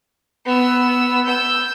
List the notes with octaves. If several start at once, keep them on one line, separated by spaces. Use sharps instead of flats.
B3 E6
E6 G6